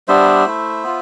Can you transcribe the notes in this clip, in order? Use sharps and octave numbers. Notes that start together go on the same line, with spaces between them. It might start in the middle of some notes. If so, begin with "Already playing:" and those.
G3 B3 D4 C5 E5
A3 E4
B3 F4